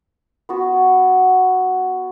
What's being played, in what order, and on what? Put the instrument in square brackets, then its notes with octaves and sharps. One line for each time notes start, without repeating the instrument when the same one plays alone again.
[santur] B3 F#4